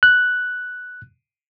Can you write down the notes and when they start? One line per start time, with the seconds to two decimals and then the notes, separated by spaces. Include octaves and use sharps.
0.03 F#6